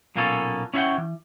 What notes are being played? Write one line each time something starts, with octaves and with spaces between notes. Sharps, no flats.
B1 A#2 A#3 B3 C#4 A4
C#4 E4 C#5 E5 F#5 G5
E3